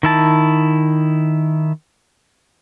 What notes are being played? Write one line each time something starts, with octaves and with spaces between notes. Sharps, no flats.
D#3 E4 A5